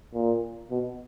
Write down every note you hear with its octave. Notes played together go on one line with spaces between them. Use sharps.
A#2
B2